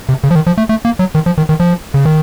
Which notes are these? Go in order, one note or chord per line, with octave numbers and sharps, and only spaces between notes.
C3
C#3
F3
D#3
F3
A3
A3
A#3
F#3
D#3
F3
D#3
D#3
F3
C#3
D#3